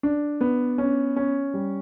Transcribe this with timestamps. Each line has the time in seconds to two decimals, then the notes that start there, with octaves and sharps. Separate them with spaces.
0.03 D4
0.41 B3
0.78 C#4
1.16 C#4
1.54 G3